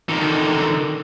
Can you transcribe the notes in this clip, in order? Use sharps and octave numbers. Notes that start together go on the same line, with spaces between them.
D3 D#3